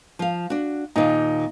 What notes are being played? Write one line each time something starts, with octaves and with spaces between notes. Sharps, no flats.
F3 F5
D4 F#4
D#2 A#2 D#4